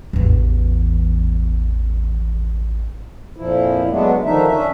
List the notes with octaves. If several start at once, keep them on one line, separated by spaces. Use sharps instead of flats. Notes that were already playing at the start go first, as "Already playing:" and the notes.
A1 E2
F2 A#2 F3 E4
F#3 G#3 A3 B3 D4
D3 D#3 F3 D4 D#4 E5
C#4 D4 E5